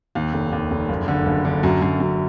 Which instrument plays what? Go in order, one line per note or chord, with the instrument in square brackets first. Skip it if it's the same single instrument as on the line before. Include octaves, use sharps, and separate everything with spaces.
[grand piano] D#2
F1
D#2
F1
F#1
D3
F#1
D3
F#2
F#2
F#2